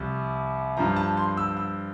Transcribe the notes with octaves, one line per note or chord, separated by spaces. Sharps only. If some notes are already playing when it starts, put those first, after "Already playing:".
Already playing: C2 C3 F3
G2 F3 A#5
A5
C6
E6
E6